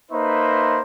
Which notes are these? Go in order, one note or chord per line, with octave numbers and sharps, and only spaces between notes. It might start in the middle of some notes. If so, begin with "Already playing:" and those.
A#3 D#4 B4 C5 E5 C6